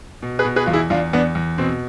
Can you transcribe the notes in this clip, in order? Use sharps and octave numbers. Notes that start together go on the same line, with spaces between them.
B2
G#4 B4
B2
G#4 B4
E2 F4
E4 G#4
E2 D4 F4
E2 B3 D4
E2
B2 C4